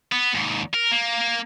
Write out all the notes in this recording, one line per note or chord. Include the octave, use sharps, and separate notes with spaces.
B3
D#2 G#2
A#4
A#3